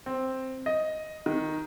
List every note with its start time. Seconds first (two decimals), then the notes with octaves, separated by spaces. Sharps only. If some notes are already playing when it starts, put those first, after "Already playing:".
0.06 C4
0.66 D#5
1.26 D#3